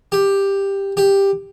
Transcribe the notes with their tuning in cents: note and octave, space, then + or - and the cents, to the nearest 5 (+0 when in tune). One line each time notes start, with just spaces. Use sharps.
G4 +10
G4 +10